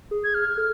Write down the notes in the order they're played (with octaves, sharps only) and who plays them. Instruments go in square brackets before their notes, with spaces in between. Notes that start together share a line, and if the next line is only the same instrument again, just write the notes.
[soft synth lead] G#4
[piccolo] G#6
F6
[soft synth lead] A4 [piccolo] F6